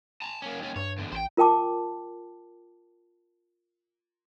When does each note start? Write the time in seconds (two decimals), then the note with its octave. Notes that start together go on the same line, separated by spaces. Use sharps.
0.22 A5 A#5
0.42 A#3 C#4
0.59 D#2 C#4
0.76 G2 C#5
0.98 E2 D3
1.12 A1 C5 G5
1.37 F4 A#4 G5 A5 D6